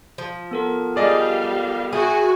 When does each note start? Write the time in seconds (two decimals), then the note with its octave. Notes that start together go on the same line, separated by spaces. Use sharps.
0.18 F3
0.51 B3 A4 A#4
0.96 G3 G#4 D5 D#5 F5
1.93 F#4 G#4 E5 G5 G#5 B5